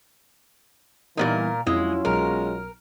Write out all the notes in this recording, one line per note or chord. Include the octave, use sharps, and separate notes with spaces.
A#2 C#3 E3 G3 B3 D#4 A#4
F2 F#3 G#3 C#4 E4 F4
B1 G#3 A#4 F6